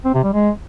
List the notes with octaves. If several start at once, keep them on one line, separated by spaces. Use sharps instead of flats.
C4
C3
G3
G#3